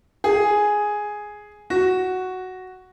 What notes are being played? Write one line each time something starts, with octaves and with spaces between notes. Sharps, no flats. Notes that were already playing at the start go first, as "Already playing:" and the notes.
G#4
F#4